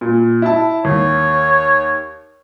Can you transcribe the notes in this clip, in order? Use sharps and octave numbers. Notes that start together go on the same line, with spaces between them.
A#2
E4 A5
D#2 C#5